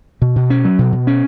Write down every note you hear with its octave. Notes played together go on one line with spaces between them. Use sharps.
B2
B2
C#4
F#3
B2
B2
C#4